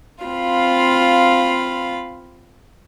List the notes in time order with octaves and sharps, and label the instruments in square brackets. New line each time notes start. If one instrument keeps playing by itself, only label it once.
[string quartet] C4 F4 F5 B5